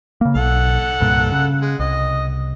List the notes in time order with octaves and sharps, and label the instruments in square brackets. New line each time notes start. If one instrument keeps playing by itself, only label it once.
[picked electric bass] C#3 A#3
[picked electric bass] B1 [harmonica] A4 F#5
[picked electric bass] C2 G2 A#2
C#3
[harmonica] G#3
[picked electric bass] C2 [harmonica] D#5